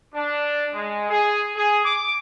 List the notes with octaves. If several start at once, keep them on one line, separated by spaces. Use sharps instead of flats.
D4
G#3
G#4
G#4
D6